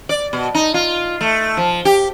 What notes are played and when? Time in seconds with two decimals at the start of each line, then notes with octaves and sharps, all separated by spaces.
0.09 D5
0.33 B2
0.55 D#4
0.74 F4
1.21 A3
1.57 F3
1.85 G4